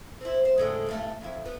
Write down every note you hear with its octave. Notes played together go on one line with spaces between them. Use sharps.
C4 E4
C5
A2 D3 G#3
E2 G2 A3
F2 E4
B3